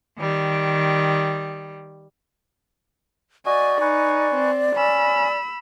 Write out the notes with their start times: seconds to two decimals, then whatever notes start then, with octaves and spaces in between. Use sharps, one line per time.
0.17 D#3 G3
3.46 F#4 D5 D#5 G#5
3.81 D#4 B4 G#5 C#6
4.35 C4
4.76 C#4 B5 E6